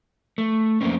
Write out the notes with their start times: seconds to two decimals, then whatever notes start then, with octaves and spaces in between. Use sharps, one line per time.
0.38 A3
0.81 F2 A3 A#3 C4 C#4